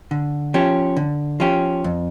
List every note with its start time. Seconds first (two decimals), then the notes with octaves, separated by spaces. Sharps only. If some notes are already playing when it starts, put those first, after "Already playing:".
0.11 D3
0.54 F3 C#4 G4
0.97 D3
1.40 F3 C#4 G4
1.84 F2